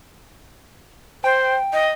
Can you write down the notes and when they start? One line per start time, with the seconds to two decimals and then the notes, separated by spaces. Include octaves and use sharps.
1.24 C5 G5
1.73 D#5